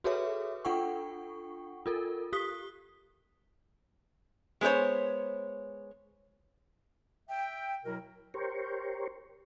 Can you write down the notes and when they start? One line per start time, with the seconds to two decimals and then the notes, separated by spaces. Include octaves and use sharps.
0.04 F#4 G#4 A4 B4 C#5 E5
0.65 D4 F4 A4 F#5 G5 C#6
1.86 F4 A4 A#4
2.33 G4 D#6 B6 G7
4.61 G#3 B3 G#4 C5 C#5
7.29 E5 G5
7.85 B2 F#3 E4 A#4
8.34 G4 A#4 C5 C#5